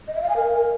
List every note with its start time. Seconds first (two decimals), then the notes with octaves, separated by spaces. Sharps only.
0.08 D#5
0.15 E5
0.22 F5
0.29 G#5
0.36 A#4